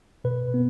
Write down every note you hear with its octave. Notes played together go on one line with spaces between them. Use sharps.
B2 B4
B3